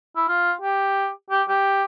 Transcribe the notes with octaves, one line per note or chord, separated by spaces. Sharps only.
E4
F4
G4
G4
G4